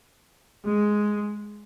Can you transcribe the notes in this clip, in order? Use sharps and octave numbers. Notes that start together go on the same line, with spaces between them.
G#3